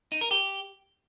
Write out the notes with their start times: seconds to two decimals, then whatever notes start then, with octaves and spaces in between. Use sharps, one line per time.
0.12 D#4
0.21 A#4
0.31 G4